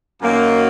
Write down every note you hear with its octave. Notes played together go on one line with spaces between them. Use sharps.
F#2 D#3 F#3 A#3